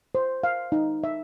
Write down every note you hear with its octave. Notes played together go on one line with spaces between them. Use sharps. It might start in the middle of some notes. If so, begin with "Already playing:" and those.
C5
F5
D#4
E5